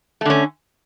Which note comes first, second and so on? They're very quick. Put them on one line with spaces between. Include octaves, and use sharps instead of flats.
A3 D3 C#4